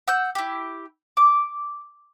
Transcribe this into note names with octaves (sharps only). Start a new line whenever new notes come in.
F#5 E6 G6
E4 G4
D6